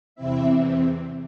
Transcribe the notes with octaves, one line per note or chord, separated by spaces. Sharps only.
E2 C3 E3 C4 E4 E5